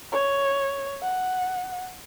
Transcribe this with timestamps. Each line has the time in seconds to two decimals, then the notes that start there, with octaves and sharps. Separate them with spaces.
0.12 C#5
1.02 F#5